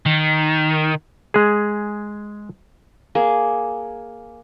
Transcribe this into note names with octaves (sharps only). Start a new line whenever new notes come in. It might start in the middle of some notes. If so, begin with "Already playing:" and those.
D#3
G#3 G#4
A#3 G#4